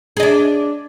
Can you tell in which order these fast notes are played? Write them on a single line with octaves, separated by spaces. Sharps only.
G#4 D#5 D4